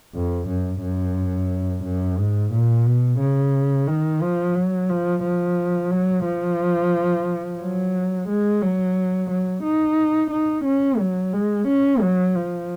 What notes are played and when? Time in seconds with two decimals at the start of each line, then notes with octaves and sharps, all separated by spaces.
0.15 F2
0.48 F#2
0.82 F#2
1.84 F#2
2.18 G#2
2.52 A#2
2.86 B2
3.19 C#3
3.87 D#3
4.22 F3
4.55 F#3
4.89 F3
5.23 F3
5.91 F#3
6.25 F3
7.60 F#3
8.29 G#3
8.62 F#3
9.30 F#3
9.63 D#4
10.31 D#4
10.65 C#4
10.99 F#3
11.33 G#3
11.68 C#4
12.01 F#3
12.35 F3